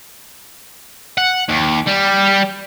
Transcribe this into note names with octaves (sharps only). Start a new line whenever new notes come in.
F#5
D#2
G3